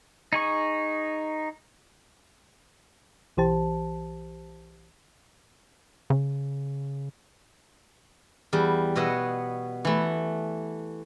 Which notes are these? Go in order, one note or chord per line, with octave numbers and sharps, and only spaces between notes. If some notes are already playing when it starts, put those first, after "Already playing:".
D#4 G#4 C#6
B1 E3 G4 C5 A5
C#3
E2 G3
B2 B3 C#5 D#5 E5 F#5
E3 A3